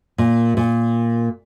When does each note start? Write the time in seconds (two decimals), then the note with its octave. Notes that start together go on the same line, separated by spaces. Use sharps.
0.18 A#2
0.57 A#2